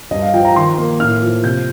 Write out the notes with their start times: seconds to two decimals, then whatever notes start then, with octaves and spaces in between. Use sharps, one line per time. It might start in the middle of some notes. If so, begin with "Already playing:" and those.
0.11 G2 D#5
0.22 F5
0.34 F3 G5
0.45 A#5
0.56 D#3 C6
0.78 A#3
1.00 A2 F6
1.22 F3
1.44 C3 G6